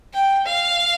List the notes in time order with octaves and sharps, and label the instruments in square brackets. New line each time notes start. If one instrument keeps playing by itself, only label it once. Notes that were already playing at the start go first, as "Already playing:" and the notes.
[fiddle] G5
F5